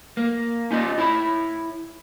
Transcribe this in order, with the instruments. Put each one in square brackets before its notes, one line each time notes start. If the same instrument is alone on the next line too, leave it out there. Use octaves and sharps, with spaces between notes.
[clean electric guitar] A#3
C#4 D#4 F4 D5 D#5
E4 C#5 E5 B5